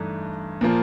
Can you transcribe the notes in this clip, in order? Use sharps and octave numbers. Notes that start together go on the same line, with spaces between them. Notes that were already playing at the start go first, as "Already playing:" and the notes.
Already playing: G2 E3 A3 D#4
A#2 F3 A#3